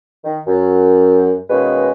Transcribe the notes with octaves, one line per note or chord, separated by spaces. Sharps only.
D#3
F#2
B2 D#3 G#3 A#3 C#4 B4